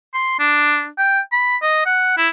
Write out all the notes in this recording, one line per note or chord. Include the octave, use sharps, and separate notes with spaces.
C6
D4
G5
B5
D#5
F#5
E4